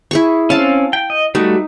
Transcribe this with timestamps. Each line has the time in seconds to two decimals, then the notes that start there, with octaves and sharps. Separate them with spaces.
0.11 E4 G#4 C#6
0.50 C4 C#4 F5 A5
0.93 G5
1.10 D#5
1.35 G3 A3 D#4 F#4